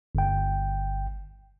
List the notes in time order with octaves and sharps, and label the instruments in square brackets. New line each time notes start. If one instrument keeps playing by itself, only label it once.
[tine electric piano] G1 G5